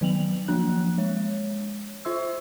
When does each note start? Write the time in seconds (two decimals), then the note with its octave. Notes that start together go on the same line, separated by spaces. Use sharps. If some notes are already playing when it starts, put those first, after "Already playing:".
0.01 D#3 F#3 B3 F7 F#7
0.48 F3 A#3 D4 F#6
0.98 G#3 C#5
2.05 F4 C5 E5 C6 E6